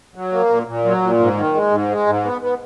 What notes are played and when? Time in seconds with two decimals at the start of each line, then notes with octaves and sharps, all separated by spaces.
0.15 F#3
0.32 A#3
0.50 A#2
0.67 A#2
0.85 F#3
1.02 A#2
1.19 G#2
1.37 D#3
1.54 G#3
1.71 G#2
1.89 G#3
2.07 G#2
2.24 B3
2.42 B3